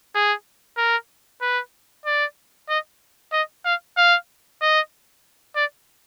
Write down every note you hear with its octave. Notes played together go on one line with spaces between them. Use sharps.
G#4
A#4
B4
D5
D#5
D#5
F5
F5
D#5
D5